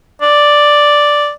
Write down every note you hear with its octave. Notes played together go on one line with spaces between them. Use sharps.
D5